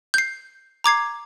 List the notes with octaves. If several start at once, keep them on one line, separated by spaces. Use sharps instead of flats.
G6 C7
A#5 D6 G#6 C7